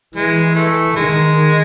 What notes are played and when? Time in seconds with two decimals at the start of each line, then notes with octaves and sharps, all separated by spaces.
0.15 E3 G#3
0.55 A3
0.96 D#3 G#3